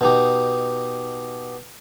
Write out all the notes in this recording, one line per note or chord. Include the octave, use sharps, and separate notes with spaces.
B2 D#4 G4